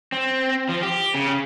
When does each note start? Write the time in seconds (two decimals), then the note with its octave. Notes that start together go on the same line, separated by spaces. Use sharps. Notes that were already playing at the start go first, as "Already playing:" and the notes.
0.12 C4
0.69 F3
0.83 G4
1.14 C#3